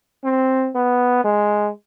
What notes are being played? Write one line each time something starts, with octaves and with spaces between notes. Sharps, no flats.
C4
B3
G#3